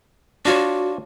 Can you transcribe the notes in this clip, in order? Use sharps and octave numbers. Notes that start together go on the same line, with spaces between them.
D4 F4 F#4 C#5